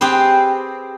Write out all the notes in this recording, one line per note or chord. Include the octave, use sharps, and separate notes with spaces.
C4 G4 G#4 B4